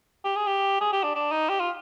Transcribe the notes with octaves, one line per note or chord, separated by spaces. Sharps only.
G4
G#4
G4
G#4
G4
D4
D4
D#4
G4
F4